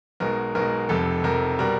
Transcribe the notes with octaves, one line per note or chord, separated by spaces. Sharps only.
B1 B2 G#3 A#4
B1 B2 G#3 A#4
F1 F2 C3 A4
F1 F2 C3 A#4
B2 G3 A#4